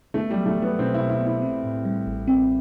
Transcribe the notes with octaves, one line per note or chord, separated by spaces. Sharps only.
A3 B3
G3
F#3
A3
F#3
B3
B2 C4
E4
B2
E4
B3
E4
C4
A2
G3
A1
C4